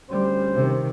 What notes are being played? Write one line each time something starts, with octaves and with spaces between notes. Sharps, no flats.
D2 G3 C#4 C5
C3 D#3